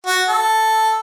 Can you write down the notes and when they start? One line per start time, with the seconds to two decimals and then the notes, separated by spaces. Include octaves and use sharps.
0.07 F#4
0.29 A4